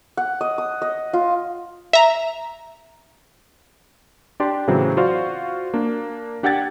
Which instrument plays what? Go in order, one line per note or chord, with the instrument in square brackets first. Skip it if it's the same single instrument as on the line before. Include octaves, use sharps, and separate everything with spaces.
[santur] F#5
D#5
D#6
D#5
F4
[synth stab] E5 A#5
[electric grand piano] D4 G4 D5 A5 C6
A2 C#3 E3 F#3 C4
F4 F#4 C5 D5 F5
A#3 D4
D4 G4 F#5 E6 G#6 A6